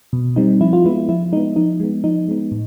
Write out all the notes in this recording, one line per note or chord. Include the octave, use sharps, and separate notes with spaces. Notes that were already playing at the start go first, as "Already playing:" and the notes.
B2
G3 C4 D#4
F3 E4
F4
G#3 B3 E4
F3 E4
G#3 B3 D#4
F3 D#4
G#3 B3
F3 D#4
G#3 B3
A2